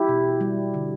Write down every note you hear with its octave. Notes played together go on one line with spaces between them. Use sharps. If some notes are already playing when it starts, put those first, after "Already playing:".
Already playing: E4 G4
B2
G3
D3